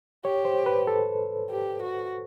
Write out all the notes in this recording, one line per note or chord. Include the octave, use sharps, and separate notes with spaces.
G4 C#5
C5
B4
A4
G4
F#4